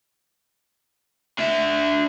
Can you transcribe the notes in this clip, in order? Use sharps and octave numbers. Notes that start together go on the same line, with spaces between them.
D4 E5